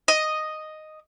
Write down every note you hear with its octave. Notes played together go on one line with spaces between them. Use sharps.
D#5